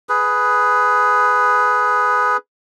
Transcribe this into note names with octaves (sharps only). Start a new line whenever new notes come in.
G#4 B4